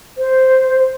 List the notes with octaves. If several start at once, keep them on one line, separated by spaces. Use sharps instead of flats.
C5